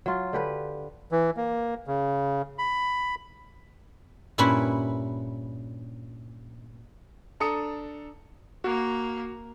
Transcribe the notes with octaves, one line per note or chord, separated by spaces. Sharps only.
F#3 F4
D3 G4 B4
E3
A#3
C#3
B5
G2 A#2 C#4 E4 B4 B5
D4 A4 A#5 D#6 C#7
A#3 F#4